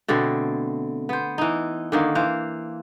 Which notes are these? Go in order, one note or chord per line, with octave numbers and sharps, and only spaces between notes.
B2 D3 A3 C4
B3 C5
E3 D#4
D3 D#3 A#3
E3 C5 F5